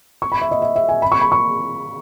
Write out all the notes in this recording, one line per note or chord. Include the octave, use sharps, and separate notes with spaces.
C#6
B5
E5
D#5
E5
E5
G#5
B5
C#6
B5
C#6